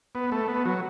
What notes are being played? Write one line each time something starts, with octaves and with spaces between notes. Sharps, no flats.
B3
A3
B3
F#3